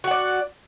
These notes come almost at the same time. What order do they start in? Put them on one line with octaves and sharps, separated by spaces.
F#4 F#5 D5